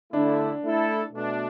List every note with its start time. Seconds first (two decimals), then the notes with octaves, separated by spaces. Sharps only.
0.13 D3 A3 D4 E4
0.63 A3 E4 A4
1.13 B2 A3 D4